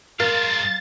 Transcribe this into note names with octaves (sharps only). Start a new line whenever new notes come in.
G2 G#3 A#4 F5 A6